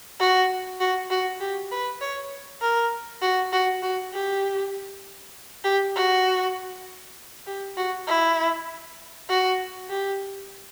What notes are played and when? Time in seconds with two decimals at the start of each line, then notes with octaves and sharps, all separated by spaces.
0.20 F#4
0.80 F#4
1.10 F#4
1.40 G4
1.71 B4
2.01 C#5
2.61 A#4
3.22 F#4
3.53 F#4
3.82 F#4
4.13 G4
5.64 G4
5.96 F#4
7.47 G4
7.77 F#4
8.07 E4
9.29 F#4
9.90 G4